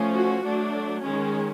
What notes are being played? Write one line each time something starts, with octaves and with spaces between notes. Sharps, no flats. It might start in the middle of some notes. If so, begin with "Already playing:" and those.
Already playing: F3 A3 C#4
F#4
F#3 A3 D4
D#3 G#3 C#4